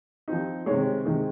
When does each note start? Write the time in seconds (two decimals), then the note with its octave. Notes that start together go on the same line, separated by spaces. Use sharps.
0.28 F3 C4 D#4
0.66 C3 D#3 G#3 C#5
1.05 C3 D#3 G#3